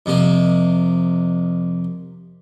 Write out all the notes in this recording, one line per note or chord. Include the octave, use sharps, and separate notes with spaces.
F2 C3 A#3